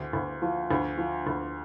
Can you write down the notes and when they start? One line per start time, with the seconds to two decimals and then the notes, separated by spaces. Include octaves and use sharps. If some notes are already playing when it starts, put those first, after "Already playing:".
Already playing: D2
0.13 D2
0.42 F3
0.71 D2
0.98 F3
1.27 D2